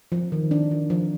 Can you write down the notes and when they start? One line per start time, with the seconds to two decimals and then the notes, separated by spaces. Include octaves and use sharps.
0.12 F3
0.32 D#3
0.51 D4
0.71 F3
0.90 F3